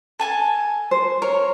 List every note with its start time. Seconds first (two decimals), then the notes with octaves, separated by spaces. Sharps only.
0.19 A4 G#5 A5
0.91 C5
1.22 A#4 C#5